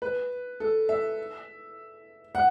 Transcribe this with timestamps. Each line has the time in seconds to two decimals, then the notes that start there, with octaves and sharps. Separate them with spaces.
0.02 B4
0.60 A4
0.89 E5
2.35 F#5